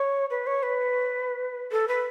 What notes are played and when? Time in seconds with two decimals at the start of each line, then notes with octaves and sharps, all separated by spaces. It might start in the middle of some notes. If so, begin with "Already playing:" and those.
Already playing: C#5
0.30 B4
0.47 C#5
0.63 B4
1.72 A4
1.88 B4